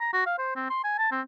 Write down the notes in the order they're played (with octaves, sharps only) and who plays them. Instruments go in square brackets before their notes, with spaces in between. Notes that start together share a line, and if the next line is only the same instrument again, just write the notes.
[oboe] A#5
F#4
F5
C5
C4
C6
G#5
A5
C4